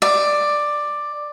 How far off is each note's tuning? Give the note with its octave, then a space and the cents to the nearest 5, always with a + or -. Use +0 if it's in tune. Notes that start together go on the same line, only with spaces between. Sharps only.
D5 +10